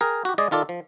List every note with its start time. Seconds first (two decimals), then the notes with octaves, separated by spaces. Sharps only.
0.01 G#4 A#4 G5
0.25 F#4 G4
0.38 G#3 G#4 D5 D#5
0.51 D#3 F4 A4 D5
0.69 F3